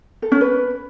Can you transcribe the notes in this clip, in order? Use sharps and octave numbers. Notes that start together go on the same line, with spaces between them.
A4
C#4
B4